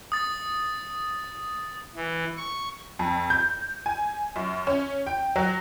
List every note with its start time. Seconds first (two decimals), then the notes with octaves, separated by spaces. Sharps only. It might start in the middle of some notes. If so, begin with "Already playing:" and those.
0.12 D#6 A6
1.96 E3
2.37 C#6
2.99 F2
3.30 G6
3.86 G#5
4.36 F#2
4.67 C#4
5.07 G5
5.36 F#3